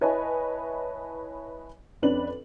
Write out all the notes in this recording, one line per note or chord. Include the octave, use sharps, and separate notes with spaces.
E4 B4 C#5 D#5 G#5 A5
F2 C#4 D4 B4 F#7